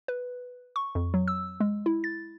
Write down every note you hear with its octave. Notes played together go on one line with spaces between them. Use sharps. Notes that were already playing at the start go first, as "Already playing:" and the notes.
B4
C#6
F2
F#3
E6
G#3
E4
A6